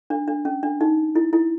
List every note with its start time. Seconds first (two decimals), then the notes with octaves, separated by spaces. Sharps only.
0.10 D4
0.28 D4
0.45 C#4
0.63 D4
0.81 D#4
1.16 E4
1.33 E4